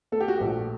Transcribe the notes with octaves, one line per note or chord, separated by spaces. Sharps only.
A3 A4
G4
F#4
A#1 G4